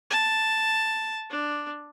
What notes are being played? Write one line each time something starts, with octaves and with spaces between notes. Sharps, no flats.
A5
D4